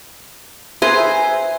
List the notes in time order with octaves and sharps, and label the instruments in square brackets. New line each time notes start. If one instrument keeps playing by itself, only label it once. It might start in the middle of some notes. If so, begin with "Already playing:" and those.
[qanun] G#4 B4 A#5 [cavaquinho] C5 [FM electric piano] E5 G#5